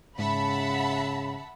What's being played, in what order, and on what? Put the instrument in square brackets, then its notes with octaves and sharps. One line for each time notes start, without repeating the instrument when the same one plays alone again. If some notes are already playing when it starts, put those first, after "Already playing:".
[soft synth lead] G#2 [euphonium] C#3 [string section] E5 F#5 A5 [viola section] B5